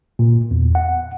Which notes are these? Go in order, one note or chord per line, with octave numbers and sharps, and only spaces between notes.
A#2
E2
F#5